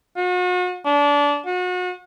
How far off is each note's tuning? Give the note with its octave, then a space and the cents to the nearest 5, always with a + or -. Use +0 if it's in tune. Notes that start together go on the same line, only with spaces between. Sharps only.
F#4 -40
D4 -25
F#4 -35